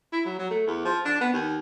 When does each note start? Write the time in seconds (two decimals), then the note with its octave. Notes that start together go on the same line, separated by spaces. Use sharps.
0.13 E4
0.25 F#3
0.39 F#3
0.51 A3
0.67 E2
0.85 F3
1.05 D4
1.21 B3
1.34 D#2